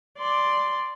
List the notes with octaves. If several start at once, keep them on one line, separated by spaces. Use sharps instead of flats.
D5 C6